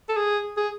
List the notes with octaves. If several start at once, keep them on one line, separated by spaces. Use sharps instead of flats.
A4
G#4
G#4